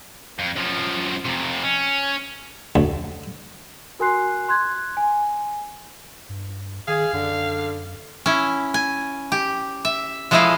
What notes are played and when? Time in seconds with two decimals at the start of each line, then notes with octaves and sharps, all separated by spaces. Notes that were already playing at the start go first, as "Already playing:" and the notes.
0.39 F2
0.56 F#2 F3
1.25 F2 C3
1.64 C#4
2.76 D2
3.99 F#4 A#4 G#5 C6 F#6 C7
4.48 C6 F#6 G#6
4.97 G#5
6.29 G2
6.88 D#3 G#4 F5
7.13 F#2 D3
8.26 C#4 E4
8.74 G#5
9.32 G4
9.85 E5
10.31 F3 G#3 A3 E4 D#5 F5